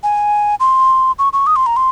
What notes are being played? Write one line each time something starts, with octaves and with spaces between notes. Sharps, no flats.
G#5
C6
C#6
C#6
D#6
C6
A#5
C6